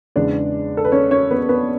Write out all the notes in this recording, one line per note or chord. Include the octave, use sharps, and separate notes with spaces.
E2 C#3 G#3 B3 D4 D5
A4
B4
C#4 C#5
C#4 C#5
B3 B4
B3 B4